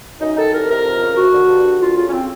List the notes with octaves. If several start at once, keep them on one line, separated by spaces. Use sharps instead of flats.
F#2 D#4
D#3 A4
C2 A#4
C3 A#4
F2
C#3
D2 F#4
D3
G2
D3
D2 F4
C#3 F4
C#4
C4